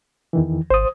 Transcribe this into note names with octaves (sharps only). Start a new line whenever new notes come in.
E2 D#3 E3
G#1 C5 D#6